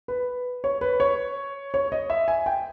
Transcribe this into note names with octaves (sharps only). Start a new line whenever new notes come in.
B4
C#5
B4
C#5
C#5
D#5
E5
G#5
G5